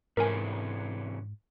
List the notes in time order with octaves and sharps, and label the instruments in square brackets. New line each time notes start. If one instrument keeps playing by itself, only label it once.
[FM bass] G#2 [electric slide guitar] C3 E3 C#4 [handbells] A#4 G#5